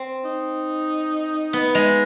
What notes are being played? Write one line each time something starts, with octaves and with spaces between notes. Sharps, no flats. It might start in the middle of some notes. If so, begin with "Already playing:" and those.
Already playing: C4
D#4
B3
G#3